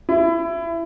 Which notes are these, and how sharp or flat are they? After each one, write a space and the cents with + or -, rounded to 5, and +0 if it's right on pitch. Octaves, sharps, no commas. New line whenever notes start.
E4 +20